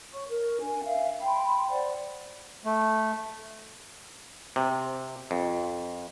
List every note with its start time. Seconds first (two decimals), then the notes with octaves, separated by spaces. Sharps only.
0.13 C#5 C#6
0.29 A#4
0.60 D4 G#5
0.85 E5 F5
1.20 G5 B5 C6
1.70 C5 D5 F#5
2.65 A3
4.56 C3
5.31 F2